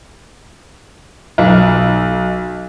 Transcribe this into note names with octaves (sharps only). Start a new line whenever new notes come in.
B1